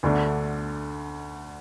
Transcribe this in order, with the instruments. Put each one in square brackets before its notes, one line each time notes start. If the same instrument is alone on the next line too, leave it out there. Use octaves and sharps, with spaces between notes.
[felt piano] D2 D3 A3 D4